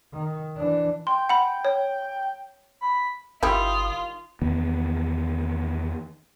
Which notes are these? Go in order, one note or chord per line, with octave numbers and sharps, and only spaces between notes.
D#3
E3 D4
G5 C6
F#5 B5
C#5
B5
G1 D#3 G3 E4 F4 D#6
E2 D#3 B3